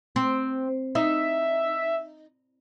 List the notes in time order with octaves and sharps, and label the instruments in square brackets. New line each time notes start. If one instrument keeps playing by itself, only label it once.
[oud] C4
[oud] D#4 [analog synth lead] E5